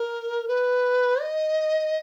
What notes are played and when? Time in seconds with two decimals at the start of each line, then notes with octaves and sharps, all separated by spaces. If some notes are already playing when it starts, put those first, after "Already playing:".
Already playing: A#4
0.48 B4
1.21 D#5